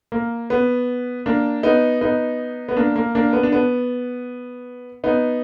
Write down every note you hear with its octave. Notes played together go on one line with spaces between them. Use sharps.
A#3
B3
A#3 D4
B3 D#4
B3 D#4
B3
A#3 D4
A#3
A#3 D4
B3
D4
B3
B3 D#4